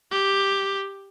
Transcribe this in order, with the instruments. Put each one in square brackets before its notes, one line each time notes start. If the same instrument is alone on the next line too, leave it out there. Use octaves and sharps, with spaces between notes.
[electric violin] G4